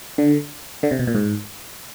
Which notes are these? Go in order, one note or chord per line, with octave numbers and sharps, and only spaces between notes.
D3
D3
C3
B2
A#2
G#2